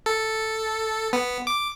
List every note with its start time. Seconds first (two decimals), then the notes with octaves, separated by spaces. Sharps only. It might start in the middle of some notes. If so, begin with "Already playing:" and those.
0.06 A4
1.13 B3
1.47 D6